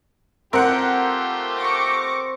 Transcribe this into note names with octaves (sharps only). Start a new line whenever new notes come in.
A3 C4 F4 G4 A#4 F#5
C#6 D6 A#6